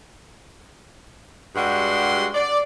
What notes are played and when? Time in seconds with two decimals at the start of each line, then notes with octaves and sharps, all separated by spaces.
1.56 G2 G3 G#3 F#4 F#5 C6
2.34 D5